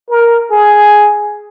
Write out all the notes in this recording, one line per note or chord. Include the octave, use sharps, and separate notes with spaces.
A#4
G#4